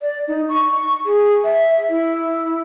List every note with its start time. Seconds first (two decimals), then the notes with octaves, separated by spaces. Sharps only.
0.02 D5
0.28 D#4
0.49 C#6
1.06 G#4
1.44 E5
1.89 E4